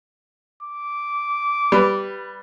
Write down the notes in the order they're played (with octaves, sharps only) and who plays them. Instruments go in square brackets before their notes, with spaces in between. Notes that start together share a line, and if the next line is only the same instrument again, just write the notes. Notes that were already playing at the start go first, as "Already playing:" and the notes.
[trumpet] D6
[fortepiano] G3 B4